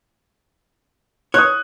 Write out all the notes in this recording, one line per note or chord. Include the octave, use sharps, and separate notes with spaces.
C#5 D#6 F#6